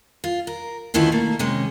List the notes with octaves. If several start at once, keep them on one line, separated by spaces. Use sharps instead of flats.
F4
A#4
D2 D#3 F3 C#4 E4 B4
B2 A3 A#3
C3 D#3 G#3 C#4